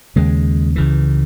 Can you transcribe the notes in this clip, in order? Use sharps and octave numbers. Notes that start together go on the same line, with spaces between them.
D#2 C#3 G#3
C#2 C#3 E3